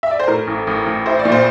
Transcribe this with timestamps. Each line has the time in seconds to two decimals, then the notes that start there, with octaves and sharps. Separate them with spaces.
0.03 E5
0.11 D5
0.19 C5
0.28 A2 A#4
0.47 A1
0.67 A1
0.86 A1
1.06 E4 C5
1.19 D5
1.25 A#2
1.32 C5